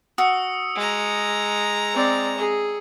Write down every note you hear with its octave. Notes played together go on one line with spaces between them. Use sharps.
F#4 D#6 E6 C#7
G#3 A#5
C4 D5
G#4